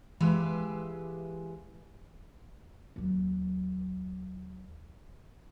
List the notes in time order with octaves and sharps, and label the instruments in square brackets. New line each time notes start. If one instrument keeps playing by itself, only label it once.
[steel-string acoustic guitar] E3 G#3 G4 B4 E5 F5
[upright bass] D#2 F#3